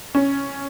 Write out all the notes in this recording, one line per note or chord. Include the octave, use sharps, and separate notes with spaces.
C#4